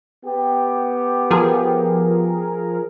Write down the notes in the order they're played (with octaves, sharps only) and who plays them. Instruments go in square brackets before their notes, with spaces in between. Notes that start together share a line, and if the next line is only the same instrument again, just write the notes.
[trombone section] B3 G4
[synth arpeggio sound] F3 G#4 A#4